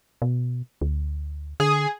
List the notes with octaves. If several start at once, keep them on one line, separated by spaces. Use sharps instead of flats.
B2
D2
D3 G#4